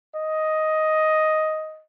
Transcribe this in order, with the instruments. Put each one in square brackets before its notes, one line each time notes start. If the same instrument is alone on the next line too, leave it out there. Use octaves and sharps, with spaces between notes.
[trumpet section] D#5